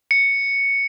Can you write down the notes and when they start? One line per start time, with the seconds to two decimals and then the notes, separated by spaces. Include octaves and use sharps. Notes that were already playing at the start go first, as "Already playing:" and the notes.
0.11 C#7